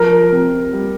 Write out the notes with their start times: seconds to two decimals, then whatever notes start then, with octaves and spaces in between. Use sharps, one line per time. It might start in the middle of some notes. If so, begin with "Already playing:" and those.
Already playing: F3 A#4
0.32 C3
0.73 G3